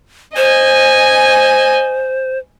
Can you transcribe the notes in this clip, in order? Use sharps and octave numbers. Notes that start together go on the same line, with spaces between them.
C5 D#5 G#5